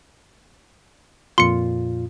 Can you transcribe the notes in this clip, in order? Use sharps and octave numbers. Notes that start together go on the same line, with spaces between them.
F2 A#2 F4 C6 C#7